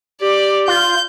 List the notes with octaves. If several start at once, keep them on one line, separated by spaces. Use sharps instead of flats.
G4 D5
F4 G6